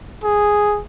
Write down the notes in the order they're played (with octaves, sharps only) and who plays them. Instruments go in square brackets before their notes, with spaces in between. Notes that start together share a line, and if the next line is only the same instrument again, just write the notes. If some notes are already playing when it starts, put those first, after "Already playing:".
[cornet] G#4